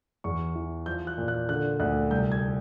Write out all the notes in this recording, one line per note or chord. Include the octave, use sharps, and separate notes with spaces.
E2 C#6
E3
F3 G6
F#6
A#2
F#6
D3 F#6
D2 F#6
C2 G6
G#6